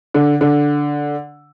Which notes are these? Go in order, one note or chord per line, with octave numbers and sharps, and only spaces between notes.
D3
D3